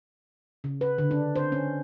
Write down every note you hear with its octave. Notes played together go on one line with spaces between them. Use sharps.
C#3
B4
D3
D4
C5
C#4